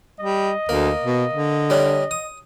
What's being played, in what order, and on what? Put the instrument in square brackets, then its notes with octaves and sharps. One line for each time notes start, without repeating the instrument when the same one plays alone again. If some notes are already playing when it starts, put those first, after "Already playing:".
[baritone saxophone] G3 [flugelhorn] D#5
[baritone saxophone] D2 [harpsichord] A#3
[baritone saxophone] B2
D3
[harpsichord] G3 C#4 D4
D#6